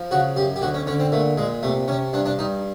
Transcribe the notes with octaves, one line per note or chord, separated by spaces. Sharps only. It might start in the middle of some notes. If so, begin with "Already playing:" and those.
Already playing: F3
C#3 F#4
F#2 G4
G4
D2 F#4
C#4
D3 C#4
C4
A#2 A3
A#2 G#3
C3 A3
C3 C#4
G2 D4
D4
G2 D#4